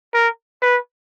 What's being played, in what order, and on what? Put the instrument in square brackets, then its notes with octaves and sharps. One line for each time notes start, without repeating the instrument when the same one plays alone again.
[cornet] A#4
B4